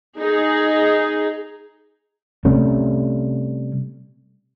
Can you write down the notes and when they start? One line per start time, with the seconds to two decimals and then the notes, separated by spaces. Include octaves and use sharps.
0.19 D#4 G#4
2.45 C3 G3 A3 C#4